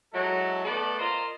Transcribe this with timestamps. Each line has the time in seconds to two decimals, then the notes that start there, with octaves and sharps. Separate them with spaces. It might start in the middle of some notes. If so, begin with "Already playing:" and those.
0.14 F#3 G#3 E4 F#4 A4
0.65 A3 B3 A4 D5
0.99 F4 A#4 C5 D#5